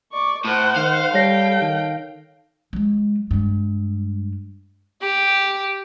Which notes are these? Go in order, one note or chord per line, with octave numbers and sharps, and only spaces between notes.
D5 C#6
A2 C5 F#5
D#3 F5
G3 A4 C#5 G5 A#6 C7
D#3
F#3 G#3
G2 G#3
G4